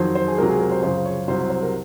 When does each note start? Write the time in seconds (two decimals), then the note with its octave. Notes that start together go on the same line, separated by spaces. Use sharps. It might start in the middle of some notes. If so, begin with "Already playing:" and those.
Already playing: F2 D#3 F#3 C5
0.15 C5
0.28 G#4
0.38 C#2 C3 F#3 A#4
0.49 G#4
0.60 A#4
0.72 C5
0.83 F#2 C#3 F3 C5
1.05 C#5
1.28 C2 C3 F#3 C5
1.50 C5
1.63 A#4